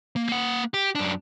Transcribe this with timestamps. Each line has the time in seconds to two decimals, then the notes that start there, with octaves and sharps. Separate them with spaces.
0.16 A#3
0.28 A#3 F#5
0.74 G4
0.95 F#2 D4